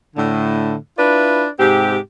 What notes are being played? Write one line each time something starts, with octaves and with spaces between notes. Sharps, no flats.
A2 D3
D4 E4 F4 B4 D5
G#2 C3 C4 G4